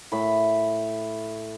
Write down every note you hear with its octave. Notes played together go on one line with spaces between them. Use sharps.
A2 B5